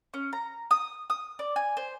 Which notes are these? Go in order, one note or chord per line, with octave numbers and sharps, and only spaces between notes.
C#4
A#5
D#6
D#6
D5
G#5
C5